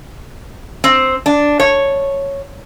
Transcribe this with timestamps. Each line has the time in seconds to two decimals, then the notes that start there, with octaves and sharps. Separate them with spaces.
0.84 C4
1.26 D4
1.60 C#5